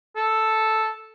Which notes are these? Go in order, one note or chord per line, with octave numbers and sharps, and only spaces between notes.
A4